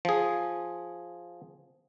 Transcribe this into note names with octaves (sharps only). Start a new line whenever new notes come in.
F3 G#4